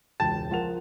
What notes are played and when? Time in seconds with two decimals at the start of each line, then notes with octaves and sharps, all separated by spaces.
0.20 E1 C#2 G5 A5
0.51 F3 F4 A#4 F#5 F7